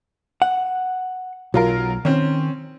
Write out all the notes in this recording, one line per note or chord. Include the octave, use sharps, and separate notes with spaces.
F#5
B1 F#3 F4 A#4
D#3 C4 C#4